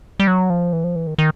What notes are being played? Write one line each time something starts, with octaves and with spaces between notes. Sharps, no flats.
G3
F#3
F3
E3
F3
E3
D#3
D#3